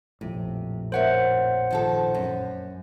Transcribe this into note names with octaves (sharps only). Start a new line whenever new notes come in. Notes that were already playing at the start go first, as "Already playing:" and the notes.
A#1 F2 A2 C3
A#4 C5 C#5 E5 F#5
D#3 F3 A4
F#2